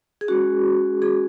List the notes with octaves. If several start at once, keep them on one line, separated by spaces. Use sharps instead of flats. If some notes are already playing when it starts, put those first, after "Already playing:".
G#4
G#3 C#4 F#4
G#4